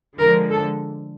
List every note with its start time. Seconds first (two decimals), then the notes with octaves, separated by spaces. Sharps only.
0.18 D3 F3 G#3 A#4
0.50 A4